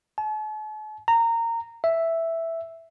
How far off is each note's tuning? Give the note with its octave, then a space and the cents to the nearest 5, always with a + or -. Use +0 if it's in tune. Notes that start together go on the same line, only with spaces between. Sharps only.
A5 -45
A#5 -20
E5 +0